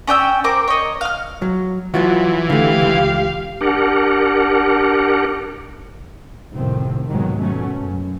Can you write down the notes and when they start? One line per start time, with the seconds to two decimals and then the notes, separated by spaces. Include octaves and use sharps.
0.07 C#4 D5 G5 E6
0.44 C4 A#4 D6
0.68 C#5 D#5
1.01 F5 F6
1.42 F#3
1.94 E3 F#3 F4 F#4
2.50 D3 A3 G4 F5
2.81 C#2
3.61 D4 G4 A#4 F#5
6.53 F1 C2 A2 D#3 C4
7.07 D#2 G#2 B2 D#3 F#3 G#3
7.39 B2 F#3 A3 C#4
7.80 F#2